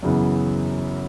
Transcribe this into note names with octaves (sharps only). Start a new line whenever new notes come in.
F#2 C#3 E3 B3